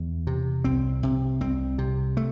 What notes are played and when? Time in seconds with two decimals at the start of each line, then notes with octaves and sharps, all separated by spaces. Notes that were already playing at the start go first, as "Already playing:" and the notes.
Already playing: E2
0.27 C3
0.64 C2 C4
1.03 C3
1.41 C2 C4
1.78 C3
2.17 A3